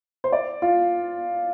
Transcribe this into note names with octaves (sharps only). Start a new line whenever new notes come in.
C5
D5
F4